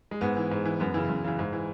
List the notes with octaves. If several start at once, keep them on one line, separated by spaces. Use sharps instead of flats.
G#3
G#2 B3
E3
G#2
E3
F#2 B3
C#3 E3
F#2
C#3 E3
G#2
E3